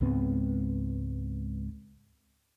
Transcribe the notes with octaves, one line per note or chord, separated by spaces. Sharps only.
C#2 G#2 B3 C4